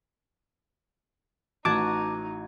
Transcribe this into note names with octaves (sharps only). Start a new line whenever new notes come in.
A1 D#4 F#4 A5 D6 G#6